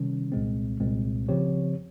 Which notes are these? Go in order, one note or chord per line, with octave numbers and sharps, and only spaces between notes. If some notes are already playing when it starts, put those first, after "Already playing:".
Already playing: C3 D#3 G3 C#4
C2 A#2 G#3 C4
C2 A#2 G#3 C4
C#3 F3 C4 G4 C#5